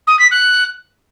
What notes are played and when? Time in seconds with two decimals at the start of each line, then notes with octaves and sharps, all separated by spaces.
0.07 D#6
0.19 B6
0.31 F#6